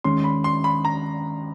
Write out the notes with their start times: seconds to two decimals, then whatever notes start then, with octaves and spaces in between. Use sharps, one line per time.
0.04 D#2 D#3 G#3 C#4 C6
0.24 B5
0.44 C6
0.64 B5
0.85 A#5